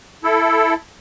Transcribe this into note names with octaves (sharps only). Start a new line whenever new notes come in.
E4 A4